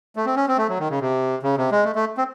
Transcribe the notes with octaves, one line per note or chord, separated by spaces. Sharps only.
A3
C4
C#4
C4
A3
F#3
D#3
C#3
C3
C#3
C3
G#3
A3
A3
C4